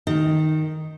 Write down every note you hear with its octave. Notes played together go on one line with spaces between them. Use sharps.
D#3